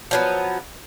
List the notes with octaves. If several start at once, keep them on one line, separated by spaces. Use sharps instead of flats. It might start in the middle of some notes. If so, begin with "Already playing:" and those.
F3 F#3 B3